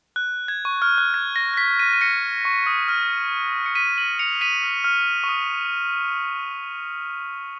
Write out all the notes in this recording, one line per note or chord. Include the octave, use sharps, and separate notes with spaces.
F#6
G#6
C#6
F6
F#6
G#6
A#6
A#6
B6
B6 D#7
D#7
A#6 C#7
C#6
D#6
F6
C#7
B6 D#7
D#7 F#7
C#7 F7
B6 D#7
F6
F6
C#6
D#6